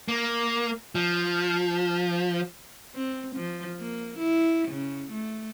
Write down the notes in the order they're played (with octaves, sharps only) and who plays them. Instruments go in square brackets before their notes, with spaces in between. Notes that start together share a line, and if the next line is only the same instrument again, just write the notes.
[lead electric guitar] A#3
F3
[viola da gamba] C4
F3
A#3
E4
C#3
A3